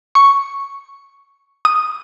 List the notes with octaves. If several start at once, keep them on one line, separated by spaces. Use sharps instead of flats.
C#6
D#6